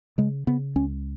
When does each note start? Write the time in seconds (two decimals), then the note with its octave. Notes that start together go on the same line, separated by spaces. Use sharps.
0.18 C#3 G#3
0.47 C#3 B3
0.76 C#2 C#4